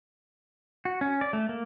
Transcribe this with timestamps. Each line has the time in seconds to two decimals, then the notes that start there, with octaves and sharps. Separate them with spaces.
0.85 F#4
1.01 C#4
1.21 D5
1.33 A3
1.49 A#3